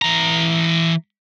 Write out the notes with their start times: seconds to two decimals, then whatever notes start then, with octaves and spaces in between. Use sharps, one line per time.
0.02 E3 A#5